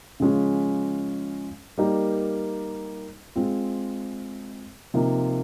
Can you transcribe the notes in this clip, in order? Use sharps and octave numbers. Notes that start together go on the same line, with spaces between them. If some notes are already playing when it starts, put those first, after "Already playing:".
C#3 F3 G#3 C#4
G3 A#3 D#4 G4 A#4
G#3 C4 F4
C3 F3 A#3 D#4